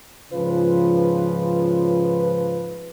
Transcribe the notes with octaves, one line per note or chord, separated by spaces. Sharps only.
G#2 C#3 F3 F4 B4